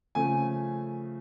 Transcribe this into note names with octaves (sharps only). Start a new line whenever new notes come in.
C#3 F3 A3 G#5